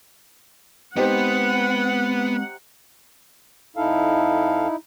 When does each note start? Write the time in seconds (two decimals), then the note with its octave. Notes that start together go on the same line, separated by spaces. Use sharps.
0.97 G#3 B3 C4 D#4 G4 C5 F#5
3.76 F2 D#4 E4 A4 F5